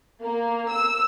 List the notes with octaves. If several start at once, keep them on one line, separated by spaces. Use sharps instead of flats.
A#3
E6